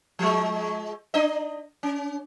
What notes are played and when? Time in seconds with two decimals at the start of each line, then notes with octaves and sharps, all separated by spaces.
0.19 F3 G#3
1.14 D4 D#5
1.83 C#4